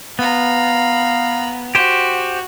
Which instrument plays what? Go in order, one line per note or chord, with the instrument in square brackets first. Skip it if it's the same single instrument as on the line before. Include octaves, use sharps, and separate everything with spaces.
[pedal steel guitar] B3 [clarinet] F5 [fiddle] A#5 B5
[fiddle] F#4 [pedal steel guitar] G4 C5